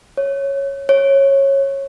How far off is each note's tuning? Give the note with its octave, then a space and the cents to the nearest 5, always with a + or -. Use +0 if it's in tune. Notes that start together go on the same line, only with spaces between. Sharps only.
C#5 -5
C#5 -15